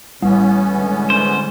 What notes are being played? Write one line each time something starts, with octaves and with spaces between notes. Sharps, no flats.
A1 E3 G3 B3 C#4
D3 G#3
C5